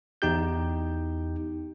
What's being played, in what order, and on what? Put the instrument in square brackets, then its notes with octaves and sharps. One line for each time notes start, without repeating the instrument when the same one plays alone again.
[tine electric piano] E2 D#4 G4 G6